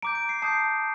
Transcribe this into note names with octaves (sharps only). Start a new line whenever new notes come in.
A#5 D6 G6 D7
D7
C7
A5 D#6 G6 C7